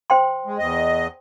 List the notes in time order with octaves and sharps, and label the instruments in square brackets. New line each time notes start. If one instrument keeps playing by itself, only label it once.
[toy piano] C5 G5 C6
[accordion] G#3
E2 D#5